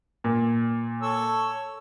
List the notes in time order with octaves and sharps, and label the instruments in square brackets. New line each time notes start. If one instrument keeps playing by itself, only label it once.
[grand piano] A#2
[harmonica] A4 C#5 E6